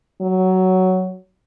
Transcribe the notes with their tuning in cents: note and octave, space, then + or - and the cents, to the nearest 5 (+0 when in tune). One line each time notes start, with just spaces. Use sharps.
F#3 +10